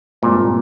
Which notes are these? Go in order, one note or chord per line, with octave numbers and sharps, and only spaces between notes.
G2 A#2 E3 G#3 C4